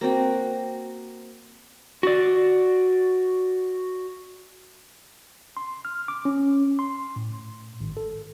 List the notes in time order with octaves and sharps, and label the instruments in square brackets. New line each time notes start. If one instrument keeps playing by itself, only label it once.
[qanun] A#3 C4 F#4 G5
[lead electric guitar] F#4 D5
[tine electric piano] C6
F6
D6
C#4
C6
A2
G#1
A4